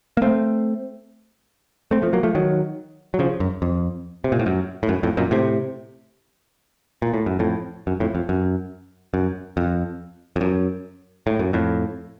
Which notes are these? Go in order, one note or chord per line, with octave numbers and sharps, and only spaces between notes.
A#3
A3 C4
A3 C4
F3 A3
F#3 A#3
F3 A3
D#3 F#3
F#3
C#3 F3
F#2
F2
C3
A#2
A2
F#2
A2
F#2
F2 A2
F#2 A#2
A2 C3
A#2
A2
F#2
F2 A2
F#2
F2 A2
F2
F#2
F#2
F2
F2
F#2
A2
F#2
F2 A2